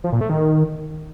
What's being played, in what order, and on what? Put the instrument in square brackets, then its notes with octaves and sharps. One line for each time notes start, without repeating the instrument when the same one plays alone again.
[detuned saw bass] F3
A#2
A3
D#3